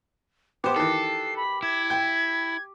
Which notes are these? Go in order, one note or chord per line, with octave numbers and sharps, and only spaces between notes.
B3 G4 C5 D6
D#3 E3 A4 C7
B5
E4 G#6
G5